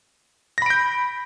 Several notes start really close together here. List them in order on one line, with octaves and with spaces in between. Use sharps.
A#6 B5 D7 G6